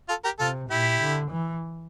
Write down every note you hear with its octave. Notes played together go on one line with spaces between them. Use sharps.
F4 A4
G4 A#4
C3 F4 A4
A#2 E4 G4
D3
E3